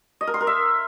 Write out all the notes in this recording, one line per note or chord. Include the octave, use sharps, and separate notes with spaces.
D#5
A#4
C6
A#4
E5